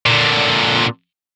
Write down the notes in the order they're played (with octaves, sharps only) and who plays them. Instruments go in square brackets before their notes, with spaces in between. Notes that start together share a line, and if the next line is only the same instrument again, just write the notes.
[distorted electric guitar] A#2 D3